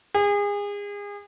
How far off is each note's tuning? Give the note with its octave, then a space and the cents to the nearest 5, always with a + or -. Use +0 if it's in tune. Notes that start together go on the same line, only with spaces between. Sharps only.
G#4 -30